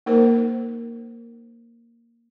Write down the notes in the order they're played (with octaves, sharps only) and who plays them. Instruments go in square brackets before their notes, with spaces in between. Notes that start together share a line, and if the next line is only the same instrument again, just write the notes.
[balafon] A#3 D#4 A#4 C5